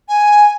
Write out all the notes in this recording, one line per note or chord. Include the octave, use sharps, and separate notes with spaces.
G#5